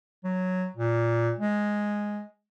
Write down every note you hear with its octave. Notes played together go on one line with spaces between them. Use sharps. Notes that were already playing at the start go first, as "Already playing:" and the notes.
F#3
A#2
G#3